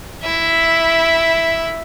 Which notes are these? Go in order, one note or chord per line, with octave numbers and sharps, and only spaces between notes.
E4 E5